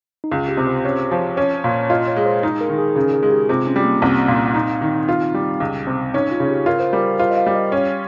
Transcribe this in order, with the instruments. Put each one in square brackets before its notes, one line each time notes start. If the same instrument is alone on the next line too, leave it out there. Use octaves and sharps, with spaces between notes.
[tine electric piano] D#4
[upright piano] C#2 [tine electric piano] F4
[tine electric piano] G4
[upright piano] C3
[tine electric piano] C5
[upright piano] C#4
F3
[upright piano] C#4 [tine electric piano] C#5
[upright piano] A#2
[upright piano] F4 [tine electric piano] D#5
[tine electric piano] C#5
[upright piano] G#3
[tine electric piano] C5
[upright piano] D#4 [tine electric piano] G#4
[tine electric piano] A#4
[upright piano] D#3
[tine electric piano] G#4
[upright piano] C#3 [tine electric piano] G#4
[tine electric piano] G#4
[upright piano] G#3
[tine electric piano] G4
[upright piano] C3 [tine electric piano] F4
[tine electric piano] C#4
[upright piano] G3
[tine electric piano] A#3
[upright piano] C2 [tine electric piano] C4
[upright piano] A#2
D#4
D#3
F4
G3
C#2
C3
[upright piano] C#4 [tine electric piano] D#4
[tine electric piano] F4
[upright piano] C#3
[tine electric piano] G4
[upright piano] F4 [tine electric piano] A#4
[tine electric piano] C5
[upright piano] G3 [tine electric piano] A#4
[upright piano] F4 [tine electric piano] C5
[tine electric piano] D#5
F5
[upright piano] G3
[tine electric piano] D#5
[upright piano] C#4 [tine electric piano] C#5